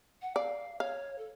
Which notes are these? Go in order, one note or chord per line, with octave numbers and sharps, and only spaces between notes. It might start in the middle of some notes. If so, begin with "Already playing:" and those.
F#5
D5 F5
C#5 F5
A4